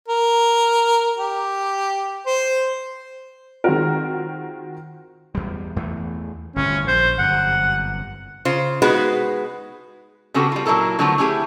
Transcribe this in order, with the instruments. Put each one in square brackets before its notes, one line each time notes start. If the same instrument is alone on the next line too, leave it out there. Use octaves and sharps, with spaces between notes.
[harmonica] A#4
G4
C5
[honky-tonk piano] D#3 G#3 C4 F4 F#4 A#4
[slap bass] E2 G3
E2 E3 A3
[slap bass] G1 A2 C3 [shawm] C#4
[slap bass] A#1 [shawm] C5
[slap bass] G1 F#2 C3 [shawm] F#5
[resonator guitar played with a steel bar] C#3 F4 C5
G#3 B3 D#4 F#4 G#4 B4
C#3 B3 C4 F#4 G4 A4
G3 F4
A#2 F#3 E4 A4 A#4
D3 F3 F#3 A3 B3 C4
A3 C#4 E4 G4 G#4